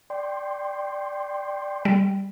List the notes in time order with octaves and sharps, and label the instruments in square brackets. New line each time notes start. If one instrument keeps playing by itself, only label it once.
[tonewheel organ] D5 G5 C6
[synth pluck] G3